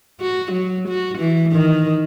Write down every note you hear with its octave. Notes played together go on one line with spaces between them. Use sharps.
F#4
F#3
F#4
E3
D#3